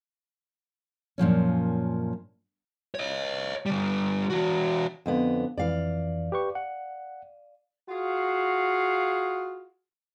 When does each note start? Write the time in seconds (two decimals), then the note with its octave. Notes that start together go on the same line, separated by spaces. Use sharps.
1.18 F#2 A#2 F3 C#4
2.95 C#5 D#5
3.66 D3 G3
4.30 E3 F#4
5.06 F2 D3 B3
5.57 F2 E3 D5 F5
6.32 G4 B4 C#6
6.55 F#5
7.89 F4 F#4 G#4 F5